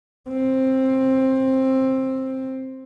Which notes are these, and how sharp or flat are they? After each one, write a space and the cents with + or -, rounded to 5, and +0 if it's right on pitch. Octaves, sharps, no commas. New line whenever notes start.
C4 +10